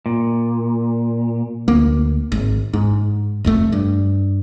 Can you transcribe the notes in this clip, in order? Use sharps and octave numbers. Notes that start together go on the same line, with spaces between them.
A#2
D2 A#3
G#1
G#2
F1 F2 A3
G2